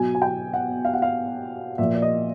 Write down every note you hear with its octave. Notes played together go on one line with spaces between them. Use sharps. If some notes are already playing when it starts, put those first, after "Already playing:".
Already playing: B2 F#3 G#5
G#5
G5
F#5
F5
F#5
F5
A#2 F3 E5
D5
D#5